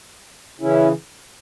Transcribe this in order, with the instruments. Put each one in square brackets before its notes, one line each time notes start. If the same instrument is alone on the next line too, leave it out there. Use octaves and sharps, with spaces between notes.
[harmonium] C#3 E3 C#4 E4